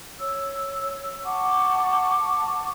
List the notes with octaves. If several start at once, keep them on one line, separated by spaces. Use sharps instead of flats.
C#5 E6
F#5 A5 C#6 D6